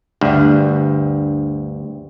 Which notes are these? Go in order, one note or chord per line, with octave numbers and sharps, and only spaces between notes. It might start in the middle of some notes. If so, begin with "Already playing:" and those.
D2 G2